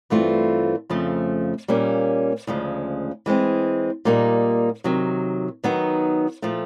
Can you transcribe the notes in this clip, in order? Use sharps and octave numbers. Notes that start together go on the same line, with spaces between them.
G2 E3 A3 C4 F4
F2 C#3 F3 A3
A#2 G3 A#3 C#4
D2 C#3 F3 G#3
E3 G#3 C4
A#2 G3 A#3 D#4
C3 D#3 F#3
D#3 F#3 B3 D#4
A#2 F3 A3